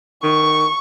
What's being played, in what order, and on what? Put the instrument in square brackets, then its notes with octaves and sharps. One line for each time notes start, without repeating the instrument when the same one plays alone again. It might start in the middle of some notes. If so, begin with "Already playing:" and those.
[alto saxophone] D#3 [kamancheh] C#6